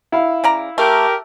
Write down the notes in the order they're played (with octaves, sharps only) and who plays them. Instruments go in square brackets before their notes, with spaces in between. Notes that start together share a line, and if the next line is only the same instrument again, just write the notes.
[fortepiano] E4 F5
[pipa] C#3 D5 A#5
[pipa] A3 [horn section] G4 A#4